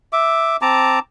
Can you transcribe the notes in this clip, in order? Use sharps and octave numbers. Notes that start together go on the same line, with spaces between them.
E5 D6
C4 A5 A#5 D6